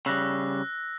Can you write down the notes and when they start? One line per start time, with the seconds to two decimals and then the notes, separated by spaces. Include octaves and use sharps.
0.06 C#3 G3 E6 F#6 A#6